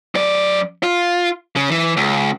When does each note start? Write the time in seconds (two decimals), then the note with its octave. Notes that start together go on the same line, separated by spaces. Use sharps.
0.15 F#2 D5
0.83 F4
1.56 C#3
1.71 E3
1.97 C#2